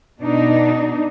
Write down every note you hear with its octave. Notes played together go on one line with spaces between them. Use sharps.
B2 D4 D#4